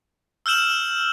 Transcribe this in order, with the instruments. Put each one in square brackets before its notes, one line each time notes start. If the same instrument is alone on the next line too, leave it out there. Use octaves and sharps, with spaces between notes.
[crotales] E6 F6 G6 E7 F#7